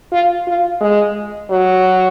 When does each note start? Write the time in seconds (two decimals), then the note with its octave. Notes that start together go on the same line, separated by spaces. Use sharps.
0.12 F4
0.48 F4
0.81 G#3
1.50 F#3